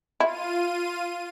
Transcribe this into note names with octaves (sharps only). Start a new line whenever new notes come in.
E4 F4 D#7